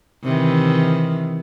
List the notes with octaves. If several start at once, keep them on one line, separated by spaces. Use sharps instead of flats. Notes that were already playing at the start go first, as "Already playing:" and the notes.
C3 D#3 E3